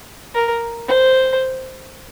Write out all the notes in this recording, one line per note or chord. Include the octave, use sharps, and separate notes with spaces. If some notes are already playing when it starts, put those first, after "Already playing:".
A#4
C5